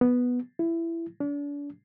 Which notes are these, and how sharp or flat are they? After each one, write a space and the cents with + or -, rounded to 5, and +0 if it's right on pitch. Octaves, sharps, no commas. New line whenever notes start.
B3 +0
E4 +15
D4 -35